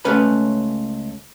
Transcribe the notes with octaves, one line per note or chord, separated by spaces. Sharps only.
C#2 A3 C#4 B4 B5